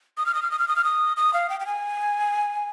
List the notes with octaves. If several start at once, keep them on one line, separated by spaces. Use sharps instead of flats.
D#6
F6
D#6
F6
D#6
F6
D#6
F6
D#6
D#6
F5
G5
G5
G#5